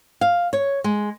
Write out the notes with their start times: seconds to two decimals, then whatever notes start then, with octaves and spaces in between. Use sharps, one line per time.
0.21 F5
0.53 C#5
0.84 G#3